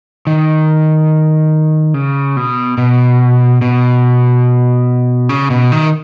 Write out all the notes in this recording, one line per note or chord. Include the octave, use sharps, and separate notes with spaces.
D#3
C#3
B2
B2
B2
C#3
B2
D#3